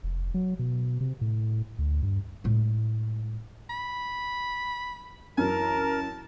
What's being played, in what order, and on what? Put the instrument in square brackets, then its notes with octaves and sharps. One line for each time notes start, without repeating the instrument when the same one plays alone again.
[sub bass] F1
F#3
B2
C3
A2
D2
G2
[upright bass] A2 G#3
[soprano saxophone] B5
[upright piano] F#2 E3 [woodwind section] A#4 [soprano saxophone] A5